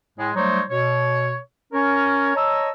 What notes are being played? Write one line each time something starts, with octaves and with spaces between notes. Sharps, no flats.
A2 G#3
F#3 G3 A3 D#4 C5 C#5
B2 C#5
C#4 A#4 C#5
C#5 D#5 A5 A#5 E6